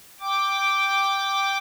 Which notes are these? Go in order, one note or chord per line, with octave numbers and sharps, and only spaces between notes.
G5 D6